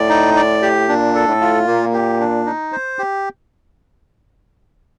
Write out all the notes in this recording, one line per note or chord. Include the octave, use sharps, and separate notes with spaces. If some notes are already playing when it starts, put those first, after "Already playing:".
Already playing: A2 D5
D#4
D5
G4
A#2 D4
A4
A2
F4
A#2 A#3
G4
D4
D#4
C5
G4